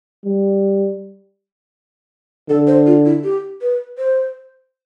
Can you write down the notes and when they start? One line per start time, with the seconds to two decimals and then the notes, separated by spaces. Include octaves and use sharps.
0.25 G3
2.49 D3 A4
2.67 C5
2.86 F4
3.05 E4
3.24 G4
3.61 B4
3.98 C5